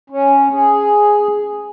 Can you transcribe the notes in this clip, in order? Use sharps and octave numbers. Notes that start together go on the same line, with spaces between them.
C#4
G#4